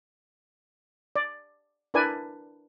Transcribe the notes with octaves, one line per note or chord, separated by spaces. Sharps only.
D5
D4 E4 A#4 B4 D5 G#5